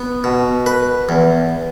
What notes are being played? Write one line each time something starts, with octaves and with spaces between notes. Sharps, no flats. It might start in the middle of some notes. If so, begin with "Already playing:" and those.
Already playing: B3
B2
B4
E2